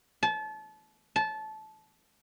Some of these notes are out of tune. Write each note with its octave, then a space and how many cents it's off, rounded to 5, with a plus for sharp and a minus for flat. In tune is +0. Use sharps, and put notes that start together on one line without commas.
A5 -30
A5 -20